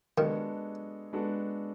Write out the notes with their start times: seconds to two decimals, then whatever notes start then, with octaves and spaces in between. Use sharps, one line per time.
0.18 D#3 G#3 B3 D4 F#4 A4
1.13 G#3 B3 D4 F#4 A4